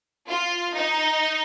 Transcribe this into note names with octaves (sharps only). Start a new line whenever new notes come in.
F4
D#4